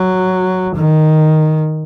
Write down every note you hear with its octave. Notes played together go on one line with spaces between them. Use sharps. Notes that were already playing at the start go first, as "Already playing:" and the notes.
Already playing: F#3
D#3